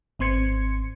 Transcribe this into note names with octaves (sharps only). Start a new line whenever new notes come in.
G#1 C4 C6 G#6 C#7